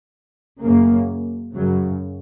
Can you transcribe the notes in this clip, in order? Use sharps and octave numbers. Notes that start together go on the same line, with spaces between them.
F#2 C#3 A#3
F#2 C#3 F#3